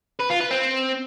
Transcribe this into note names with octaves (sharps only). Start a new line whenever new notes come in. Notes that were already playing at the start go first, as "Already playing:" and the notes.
B4
F4
B4
C4